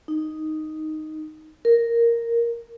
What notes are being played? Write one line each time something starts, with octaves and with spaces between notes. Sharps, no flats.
D#4
A#4